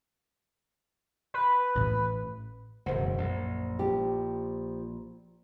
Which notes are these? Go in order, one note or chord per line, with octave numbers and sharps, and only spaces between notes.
B4
A1 A2 A3
E1 C#2 F#2 C5 F#5
A#1
F3 G4